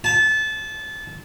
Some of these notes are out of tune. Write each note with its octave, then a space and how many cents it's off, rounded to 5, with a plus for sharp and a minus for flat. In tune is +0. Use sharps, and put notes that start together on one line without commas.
A5 -25